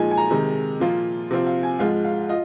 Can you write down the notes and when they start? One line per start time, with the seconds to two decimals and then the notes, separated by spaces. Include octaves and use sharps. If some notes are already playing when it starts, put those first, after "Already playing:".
Already playing: A#2 F3 G#3 D#4 G#5
0.11 G#5
0.17 A#5
0.30 C3 D#3 G#3 D#4
0.80 A#2 F3 A#3 F4
1.30 C3 F3 C4 F4
1.46 F5
1.63 G#5
1.79 G#2 F3 G#3 F4 F5
2.04 F5
2.29 F4 D#5